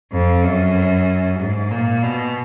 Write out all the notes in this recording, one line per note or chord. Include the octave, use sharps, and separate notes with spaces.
F2
F#2
G#2
A#2
B2